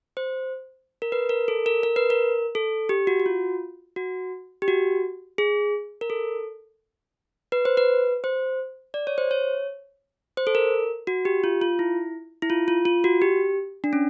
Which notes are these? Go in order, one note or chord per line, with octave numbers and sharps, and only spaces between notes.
C5
A#4
B4
A#4
A4
A#4
A#4
B4
A#4
A4
G4
F#4
F#4
F4
F#4
G4
F#4
G#4
A#4
A4
B4
C5
B4
C5
D5
C#5
C5
C#5
C5
A4
A#4
F#4
G4
F4
F4
E4
E4
F4
F4
F4
F#4
G4
D4
C#4